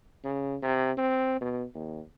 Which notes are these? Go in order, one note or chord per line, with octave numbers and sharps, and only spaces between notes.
C#3
C3
C4
B2
D#2